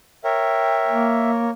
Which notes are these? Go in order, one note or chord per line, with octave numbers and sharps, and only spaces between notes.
A#4 C#5 E5 G5
A#3